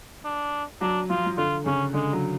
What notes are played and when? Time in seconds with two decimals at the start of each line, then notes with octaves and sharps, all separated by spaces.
0.25 D4
0.81 F#3 D4
1.10 F3 F4
1.26 F3
1.37 D3 F4
1.65 C#3 C#4
1.94 D3 G#3
2.13 F#3